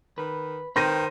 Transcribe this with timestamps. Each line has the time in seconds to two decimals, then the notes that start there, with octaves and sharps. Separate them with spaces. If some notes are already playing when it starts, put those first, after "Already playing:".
0.18 D#3 B4
0.76 D#3 B4 C5 G5 C6 A#6 D#7